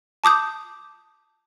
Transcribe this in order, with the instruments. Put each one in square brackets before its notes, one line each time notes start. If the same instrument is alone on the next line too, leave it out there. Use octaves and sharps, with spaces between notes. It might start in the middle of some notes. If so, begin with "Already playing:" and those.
[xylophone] A5 D6 D#6 G6